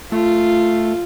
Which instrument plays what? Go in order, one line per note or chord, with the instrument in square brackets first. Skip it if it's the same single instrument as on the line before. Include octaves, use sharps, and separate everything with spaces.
[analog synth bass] A3 [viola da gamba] F4